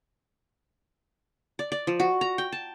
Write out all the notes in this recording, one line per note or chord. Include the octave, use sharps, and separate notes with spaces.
D5
D5
F3
F#4
A#5
G5
A5